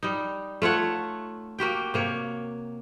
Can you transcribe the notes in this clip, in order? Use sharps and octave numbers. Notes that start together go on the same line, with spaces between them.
G3 D#4
A3 F4 C#5 F#5
A#3 F#4 G4 G5
C3 A#3 C#5